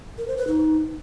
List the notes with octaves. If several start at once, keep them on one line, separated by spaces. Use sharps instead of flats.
A#4
C5
B4
D#4